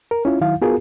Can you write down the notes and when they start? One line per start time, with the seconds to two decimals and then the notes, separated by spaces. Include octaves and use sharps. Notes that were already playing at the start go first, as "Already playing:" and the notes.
0.11 A#4
0.25 C#4 E4 F4
0.41 D#3 F#3 E4 F5
0.61 B3 F4 F#4 G#4 A#4